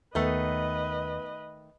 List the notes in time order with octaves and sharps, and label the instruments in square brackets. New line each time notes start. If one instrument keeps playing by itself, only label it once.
[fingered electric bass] D#2 [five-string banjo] D#3 A3 [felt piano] B3 [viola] B4 D#5